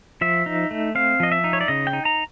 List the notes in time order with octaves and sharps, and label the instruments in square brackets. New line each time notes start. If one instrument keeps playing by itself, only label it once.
[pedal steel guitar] F3 E5
D#4
A3
C4 F5
F3 D#5
E5
D#4
C#5
D5
C#3 D#5
G5
D#4
A#5